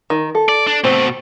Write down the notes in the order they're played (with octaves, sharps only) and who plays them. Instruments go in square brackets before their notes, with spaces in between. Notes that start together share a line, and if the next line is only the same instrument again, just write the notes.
[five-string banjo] D#3
A4
[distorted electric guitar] D5
D4
[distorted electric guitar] B2 A3 [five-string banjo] C4